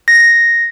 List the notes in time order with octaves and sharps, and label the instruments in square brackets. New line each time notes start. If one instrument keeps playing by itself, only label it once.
[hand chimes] A#6